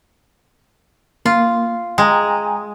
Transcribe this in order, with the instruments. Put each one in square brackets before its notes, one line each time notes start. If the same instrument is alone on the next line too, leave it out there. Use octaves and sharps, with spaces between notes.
[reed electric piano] A#3 [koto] F4
[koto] G#3 [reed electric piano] G5 G#5 A#5